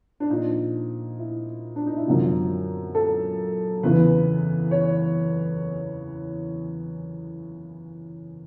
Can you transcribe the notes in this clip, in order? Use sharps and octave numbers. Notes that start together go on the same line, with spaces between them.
D4
A#2 F3 D#4
E4
D4
D#4
E4
F#2 D3 F3 F4
A4
E2 C#3 E3 B4
C#5